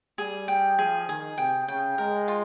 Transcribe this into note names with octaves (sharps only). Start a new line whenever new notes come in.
G3 G#4
G5
F3 G#4
D#3 G#4
C3 G5
C#3 G5
G#3 A#4
F4